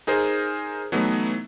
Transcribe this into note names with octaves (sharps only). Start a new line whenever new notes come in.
D#4 G#4 A#4 C5
E3 F#3 A3 B3 D#4